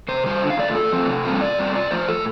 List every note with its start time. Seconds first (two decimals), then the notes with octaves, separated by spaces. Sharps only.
0.08 C3 C5
0.25 G3 F4 C5
0.42 D3
0.50 F5
0.59 A3 F4 D5
0.75 A2 A4
0.92 F3 A3 C4
1.08 C3
1.25 G3 C4 F4
1.41 C3 D5
1.58 G3 C4 F4
1.75 C3 D5
1.91 F3 A3 F4 C5
2.08 A2 A4